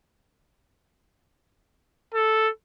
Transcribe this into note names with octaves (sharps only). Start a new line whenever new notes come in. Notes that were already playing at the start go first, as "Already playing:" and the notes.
A4